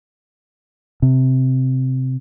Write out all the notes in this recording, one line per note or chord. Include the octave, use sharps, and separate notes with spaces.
C3